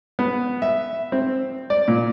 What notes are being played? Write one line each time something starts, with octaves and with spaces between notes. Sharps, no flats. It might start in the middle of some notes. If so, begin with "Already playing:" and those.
B3
E5
C4
D5
A#2